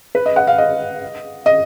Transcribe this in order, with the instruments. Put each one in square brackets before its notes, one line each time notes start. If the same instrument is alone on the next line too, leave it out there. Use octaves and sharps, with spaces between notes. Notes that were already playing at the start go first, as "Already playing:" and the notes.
[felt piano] B4
D#5
F#5
F5
D#5
D#5